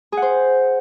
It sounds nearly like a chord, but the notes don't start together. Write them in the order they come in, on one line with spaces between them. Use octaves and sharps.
G#4 F#5 C5